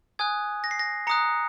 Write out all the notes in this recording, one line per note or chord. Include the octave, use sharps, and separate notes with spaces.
G#5 D#6 F#6 G#6
A#6
C7
A#6
A#5 D#6 F#6 C#7